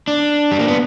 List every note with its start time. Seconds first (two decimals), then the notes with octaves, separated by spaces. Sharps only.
0.08 D4
0.52 G3
0.59 A#3
0.68 B3